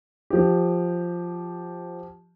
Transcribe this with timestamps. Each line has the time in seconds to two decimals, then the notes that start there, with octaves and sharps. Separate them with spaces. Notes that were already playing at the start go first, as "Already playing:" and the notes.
0.30 F3 G4